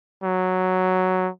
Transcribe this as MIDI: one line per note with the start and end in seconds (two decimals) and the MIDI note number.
0.24 1.30 54